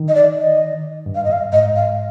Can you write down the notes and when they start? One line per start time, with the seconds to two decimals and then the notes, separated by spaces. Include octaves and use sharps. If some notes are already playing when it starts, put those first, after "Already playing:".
Already playing: D#3
0.08 D#5
0.15 D5
0.38 D#5
1.06 G2
1.15 F5
1.24 D#5
1.29 G2 F5
1.52 G#2 D#5
1.76 F5